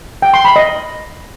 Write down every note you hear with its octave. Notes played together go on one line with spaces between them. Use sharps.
G5
C6
B5
D#5